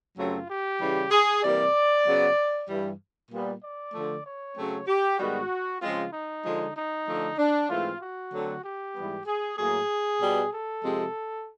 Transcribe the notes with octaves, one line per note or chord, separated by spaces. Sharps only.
F#2 C#3 F#3 A3 C4 F4
G4
C#3 E3 G3
G#4
C3 E3 G3 A#3 D5
C#3 F#3 B3
G2 E3 G3
A#2 G3 B3
D5
D3 F3 A3
C#5
C#3 F#3 A3 C4
G4
G#2 D#3 G3 B3 F#4
C#3 F3 G#3 C4 F4
D#4
D3 F3 G#3
D#4
D3 F3 A3
D4
G#2 E3 A3 C4 F4
F#4
D3 F#3 A3 C4
G4
G#2 E3 G3 B3
G#4
A2 F#3 A#3 G#4
B2 G3 B3
A4
C3 F3 G#3 C4